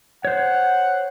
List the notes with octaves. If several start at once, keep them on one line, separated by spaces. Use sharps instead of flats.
C5 C#5 F#5